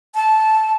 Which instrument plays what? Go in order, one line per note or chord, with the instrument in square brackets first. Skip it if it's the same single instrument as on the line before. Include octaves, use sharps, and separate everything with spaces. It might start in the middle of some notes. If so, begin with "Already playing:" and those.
[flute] A5